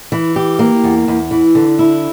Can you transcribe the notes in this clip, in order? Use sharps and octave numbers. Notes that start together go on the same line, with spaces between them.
E3
G4
A#3
E2
E2
E3
D3
E4